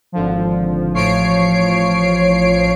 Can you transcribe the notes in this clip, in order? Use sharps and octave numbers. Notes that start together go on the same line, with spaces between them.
G#1 D3 F3
A1 F3 C#5 C7 D7